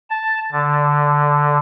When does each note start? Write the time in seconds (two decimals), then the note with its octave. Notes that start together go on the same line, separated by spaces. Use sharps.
0.10 A5
0.52 D3